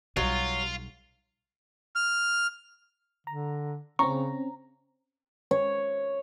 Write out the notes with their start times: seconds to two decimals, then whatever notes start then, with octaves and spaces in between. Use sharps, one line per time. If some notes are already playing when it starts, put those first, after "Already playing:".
0.17 B1 F#3 G3 F4
1.96 F6
3.27 D3 A#5
3.99 C#3 C4 C#4 A#5 C#6
5.51 C#5